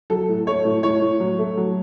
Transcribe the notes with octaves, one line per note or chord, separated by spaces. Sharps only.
F#3 A4
A2
A3 C#5
A2
A2 C#5
A2
F#3
A3
F#3